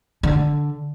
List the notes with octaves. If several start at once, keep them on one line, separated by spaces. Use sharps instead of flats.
D3